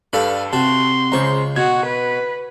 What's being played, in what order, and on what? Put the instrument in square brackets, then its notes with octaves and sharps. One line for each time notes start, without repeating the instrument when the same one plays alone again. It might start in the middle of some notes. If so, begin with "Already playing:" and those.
[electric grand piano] G2 G3 A4 [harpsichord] B4 F5 B5
[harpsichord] C3 F#4 [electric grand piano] A5 [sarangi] C6
[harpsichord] C#2 C#6 [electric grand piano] C#3 C5 A#5
[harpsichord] B2 [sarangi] F#4 [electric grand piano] G#6
[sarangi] B4